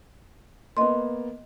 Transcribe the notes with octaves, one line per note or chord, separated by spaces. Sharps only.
A#3 B3 D#5 C6